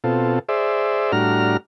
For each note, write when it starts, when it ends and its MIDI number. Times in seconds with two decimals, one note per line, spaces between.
0.04 0.39 47
0.04 0.39 60
0.04 0.39 65
0.04 0.39 69
0.49 1.12 68
0.49 1.12 72
0.49 1.12 74
0.49 1.12 76
1.12 1.57 45
1.12 1.57 55
1.12 1.57 62
1.12 1.57 66
1.12 1.57 82
1.12 1.57 89